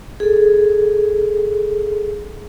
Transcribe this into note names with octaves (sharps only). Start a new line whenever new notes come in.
G#4 A4